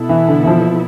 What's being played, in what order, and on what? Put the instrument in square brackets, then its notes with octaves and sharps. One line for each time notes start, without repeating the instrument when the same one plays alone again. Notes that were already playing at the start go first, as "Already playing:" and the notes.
Already playing: [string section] B2 B3 E4 A4
[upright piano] E3
D3
E3
F3